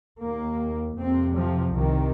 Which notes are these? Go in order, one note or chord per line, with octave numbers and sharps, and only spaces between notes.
D#2 A#3
F2 C3 C4
F3
C2 C3 D#3